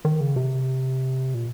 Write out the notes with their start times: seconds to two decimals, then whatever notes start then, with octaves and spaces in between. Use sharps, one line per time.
0.05 D#3
0.21 C#3
0.36 C3
1.34 A#2